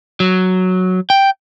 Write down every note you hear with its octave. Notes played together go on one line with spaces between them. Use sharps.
F#3
G5